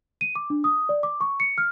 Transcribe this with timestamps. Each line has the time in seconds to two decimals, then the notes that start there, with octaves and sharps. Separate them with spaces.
0.21 D#7
0.36 D6
0.50 D4
0.64 D#6
0.89 D5
1.03 D6
1.21 C#6
1.40 C#7
1.58 F6